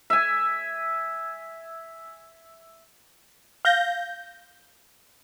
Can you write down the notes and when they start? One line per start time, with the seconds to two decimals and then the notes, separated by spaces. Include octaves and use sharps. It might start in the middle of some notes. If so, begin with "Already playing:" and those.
0.10 E5 G#5
3.65 F5 G6 A#6